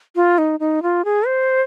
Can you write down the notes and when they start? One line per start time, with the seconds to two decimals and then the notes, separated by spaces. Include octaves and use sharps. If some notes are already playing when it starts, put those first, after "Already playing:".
0.16 F4
0.38 D#4
0.60 D#4
0.83 F4
1.05 G#4
1.27 C5